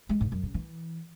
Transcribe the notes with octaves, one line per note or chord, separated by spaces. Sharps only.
G#3
G#2
F#2
C#3
E3